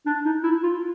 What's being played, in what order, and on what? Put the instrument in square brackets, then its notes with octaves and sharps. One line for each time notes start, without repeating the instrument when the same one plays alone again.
[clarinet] D4
D#4
E4
F4